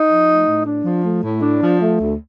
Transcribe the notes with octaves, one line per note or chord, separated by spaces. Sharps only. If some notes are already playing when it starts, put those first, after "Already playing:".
Already playing: D#4
F3
A3
A2
D4
F3
A3
A2
D4
F3
A3
D2